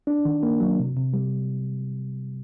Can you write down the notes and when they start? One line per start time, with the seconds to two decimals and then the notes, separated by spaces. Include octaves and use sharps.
0.07 D4
0.25 D#3
0.43 A#3
0.60 F#3
0.79 C3
0.96 C3
1.14 G3